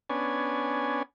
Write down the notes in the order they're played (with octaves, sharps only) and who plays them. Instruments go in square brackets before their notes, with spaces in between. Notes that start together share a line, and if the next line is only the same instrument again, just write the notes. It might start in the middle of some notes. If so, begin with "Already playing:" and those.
[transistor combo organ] B3 C#4 D4 G#5